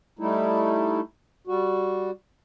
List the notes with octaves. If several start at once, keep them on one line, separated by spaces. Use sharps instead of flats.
G3 A3 D#4 E4
G3 F#4